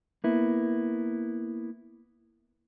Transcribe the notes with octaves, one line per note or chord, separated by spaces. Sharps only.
A#3 B3 E4